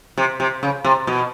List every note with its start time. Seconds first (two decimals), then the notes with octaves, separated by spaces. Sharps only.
0.18 C3
0.40 C3
0.63 C#3
0.84 C3
1.07 B2